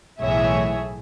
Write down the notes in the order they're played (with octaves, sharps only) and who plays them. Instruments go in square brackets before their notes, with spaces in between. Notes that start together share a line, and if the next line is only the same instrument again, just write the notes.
[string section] B1 A2 E3 G#4 C#5 E5